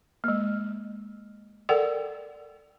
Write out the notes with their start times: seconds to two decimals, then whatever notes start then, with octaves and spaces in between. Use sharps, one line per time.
0.24 G#3 A#3
1.69 A4 A#4 D5 F#5 G5